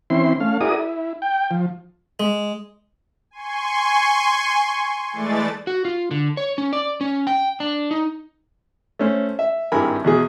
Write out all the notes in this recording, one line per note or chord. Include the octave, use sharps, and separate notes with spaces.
E3 C4 C#4 E4 C6
A3 C#4 F5
E4 F#4 G#4 A#4 D5 D#6
E4
G5
F3
G#3
G#5 C6 C#6
E3 G#3 A3 D5 A6
F#4
F4
D3
C#5
C#4
D5
C#4
G5
D4
D#4
A3 C#4 C5
E5
G#1 G2 E4 A#4 G#5 B5
E2 B2 G#4